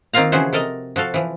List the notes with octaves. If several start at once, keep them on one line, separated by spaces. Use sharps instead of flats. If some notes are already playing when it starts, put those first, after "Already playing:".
D#3 A#3 C4 F4 F5 A#5
C#3 E3 F3 F#4 G#4 C5
C3 A4 A#4 D#5
F3 F#4 A4 F5
E3 F3